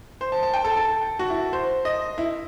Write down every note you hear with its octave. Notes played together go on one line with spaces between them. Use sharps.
C5
A5
A5
G5
A4
A4
F#4
E4
C5
D#5
E4